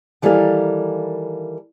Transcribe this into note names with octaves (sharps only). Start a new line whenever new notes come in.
D#3 E3 G3 A#3 A4 F5